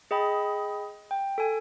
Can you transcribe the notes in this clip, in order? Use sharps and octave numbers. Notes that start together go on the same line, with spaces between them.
G#4 D#5 G5 B5
G5
A4 G#5